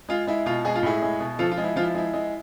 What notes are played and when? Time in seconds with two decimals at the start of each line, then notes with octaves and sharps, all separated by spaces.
0.09 G#3 F4
0.27 G#3 E4
0.46 B2 F4
0.65 G#3 G#4
0.75 F4
0.83 A2 E4 G#4
1.02 G#3
1.20 B2
1.39 F3 F4 A4
1.51 F4
1.57 G#3
1.64 E4
1.76 F3 F4
1.83 E4
1.94 G#3 E4
2.13 G#3